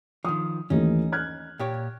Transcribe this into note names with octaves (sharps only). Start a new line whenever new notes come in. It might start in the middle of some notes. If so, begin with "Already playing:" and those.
D#3 F3 D#6
D#2 E3 A3 C#4 D#4
F6 F#6 G#6
A#2 G4 C#5